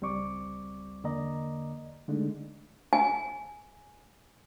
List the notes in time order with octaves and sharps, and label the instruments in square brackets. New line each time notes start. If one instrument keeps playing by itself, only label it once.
[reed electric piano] C#2 G3 C4 D5 C#6 D6
E2 D3 A#3 D5 D#5 A#5
D3 G#3 A3 D4 D#4
[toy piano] G#5